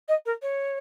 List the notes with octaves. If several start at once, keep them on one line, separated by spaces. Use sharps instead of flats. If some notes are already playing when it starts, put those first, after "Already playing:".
D#5
A#4
C#5